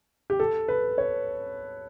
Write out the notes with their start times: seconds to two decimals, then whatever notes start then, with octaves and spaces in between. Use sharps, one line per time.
0.30 G4
0.40 A4
0.68 B4
0.98 C#5